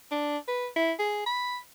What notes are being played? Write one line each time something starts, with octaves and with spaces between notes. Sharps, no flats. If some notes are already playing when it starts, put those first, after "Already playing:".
D4
B4
E4
G#4
B5